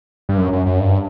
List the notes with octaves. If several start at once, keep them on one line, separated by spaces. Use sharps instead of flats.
G2
F#2
F#2
F#2
G2